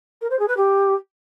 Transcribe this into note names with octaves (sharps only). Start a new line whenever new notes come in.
A#4
C5
G#4
B4
G4